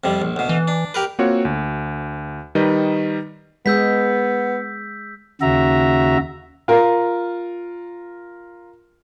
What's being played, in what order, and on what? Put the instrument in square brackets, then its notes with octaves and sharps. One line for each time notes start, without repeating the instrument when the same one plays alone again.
[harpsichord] F2 C3 G3
A#1
D2 B2
[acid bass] E3
[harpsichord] D4
G4 A#4 B4
[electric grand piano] A#3 C4 F4 F#4 C#5 F#5
D2
D#3 G3 D#4 B4 D#5
[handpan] G#3 G#4 [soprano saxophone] B3 [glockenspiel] E6 G6 B6
[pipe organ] D#2 C#3 F#4 E5 A#5
[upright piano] F4 A#4